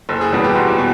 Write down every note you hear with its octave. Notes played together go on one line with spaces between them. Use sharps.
F#1 A4
G#4
E2 B2 G3 B3
G4
F#1 F#4
B2